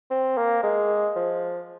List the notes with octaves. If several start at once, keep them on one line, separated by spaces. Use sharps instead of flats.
C4
A#3
G#3
F3